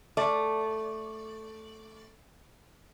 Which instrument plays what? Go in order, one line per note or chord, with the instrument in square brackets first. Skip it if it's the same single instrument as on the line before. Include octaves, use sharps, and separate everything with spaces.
[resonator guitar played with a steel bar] A3 D5